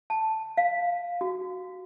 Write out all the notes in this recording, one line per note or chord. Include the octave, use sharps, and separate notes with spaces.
A5
F5
F#4